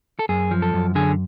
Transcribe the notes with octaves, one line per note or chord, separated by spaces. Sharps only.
A4
F#2 G#4
F3
A4
F#2
D3 G#4